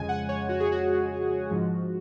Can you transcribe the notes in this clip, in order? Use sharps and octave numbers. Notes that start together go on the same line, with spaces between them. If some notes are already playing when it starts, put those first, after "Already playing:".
Already playing: F2 C#3 G#3 G#5
F#5
C#5
F#4
G#4
F#4
G#2 F3 G#3